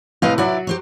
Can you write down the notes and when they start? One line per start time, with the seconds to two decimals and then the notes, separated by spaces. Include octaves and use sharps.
0.22 A2 C3 B4 D#5 F5
0.38 F#3 E4 F#4 D5 E5
0.67 G4 C5 C#5